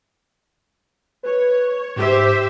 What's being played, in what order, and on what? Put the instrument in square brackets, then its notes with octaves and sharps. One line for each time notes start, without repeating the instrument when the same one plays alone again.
[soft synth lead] B4 [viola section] C#5
[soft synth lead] G#2 [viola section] G4 C5 E5